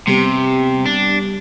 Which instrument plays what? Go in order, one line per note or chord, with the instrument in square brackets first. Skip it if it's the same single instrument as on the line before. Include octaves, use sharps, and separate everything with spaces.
[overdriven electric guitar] C3 [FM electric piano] G3 B3 G4
[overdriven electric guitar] D4